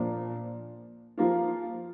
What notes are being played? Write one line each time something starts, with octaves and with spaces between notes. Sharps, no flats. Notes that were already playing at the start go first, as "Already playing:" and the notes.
Already playing: A#2 F3 A#3 D4
F3 A#3 F4